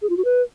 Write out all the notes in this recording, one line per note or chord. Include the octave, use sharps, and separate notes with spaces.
G#4
F4
F#4
B4